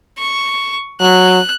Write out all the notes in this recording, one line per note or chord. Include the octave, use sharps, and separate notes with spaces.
C#6
F#3 F#6